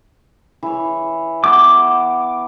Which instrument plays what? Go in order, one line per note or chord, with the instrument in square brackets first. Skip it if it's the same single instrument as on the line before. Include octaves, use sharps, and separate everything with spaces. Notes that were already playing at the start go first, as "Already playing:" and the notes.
[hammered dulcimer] E3 C#5
[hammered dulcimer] B3 F#5 [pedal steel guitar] D6